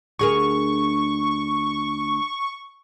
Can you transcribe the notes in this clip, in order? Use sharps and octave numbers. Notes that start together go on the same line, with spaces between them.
D2 G#4 A#4 C#6